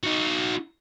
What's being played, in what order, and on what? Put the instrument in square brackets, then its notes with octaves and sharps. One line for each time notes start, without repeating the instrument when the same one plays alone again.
[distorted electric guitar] D#4 F#4